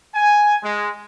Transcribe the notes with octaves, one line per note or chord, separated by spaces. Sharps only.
G#5
G#3